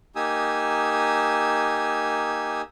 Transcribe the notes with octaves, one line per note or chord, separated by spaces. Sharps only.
A#3 D#4 G4 G#5 D#6 E6